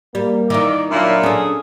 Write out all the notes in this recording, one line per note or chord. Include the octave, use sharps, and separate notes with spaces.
G3 A#3
D#3 E3 D5
A#2 F#3 D4 E4
C#4 G#4 A4